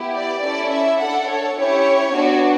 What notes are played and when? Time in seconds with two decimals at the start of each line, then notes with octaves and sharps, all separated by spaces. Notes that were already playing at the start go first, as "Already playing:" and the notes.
Already playing: B3 E4 G4
0.15 D5
0.43 C#4 E4 A4 D5
0.71 E5
1.00 D4 A4 F#5
1.28 C#5
1.57 C#4 E4 G4 C#5
2.14 B3 D4 F#4